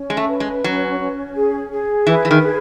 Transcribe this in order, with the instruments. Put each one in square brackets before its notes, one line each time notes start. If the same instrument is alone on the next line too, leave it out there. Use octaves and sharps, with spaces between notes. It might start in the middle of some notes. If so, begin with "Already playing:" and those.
Already playing: [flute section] C#4
[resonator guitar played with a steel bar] G#3
A3
[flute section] B4
[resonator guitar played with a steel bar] G#3
[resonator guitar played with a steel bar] F#3 [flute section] C#4
[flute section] C#4
G#4
G#4
[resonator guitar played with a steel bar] E3 [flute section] B4
[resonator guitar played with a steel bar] E3
D#3
[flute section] G#4